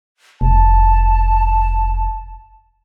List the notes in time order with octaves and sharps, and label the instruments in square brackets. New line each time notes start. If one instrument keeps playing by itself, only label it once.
[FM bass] F1 [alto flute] A5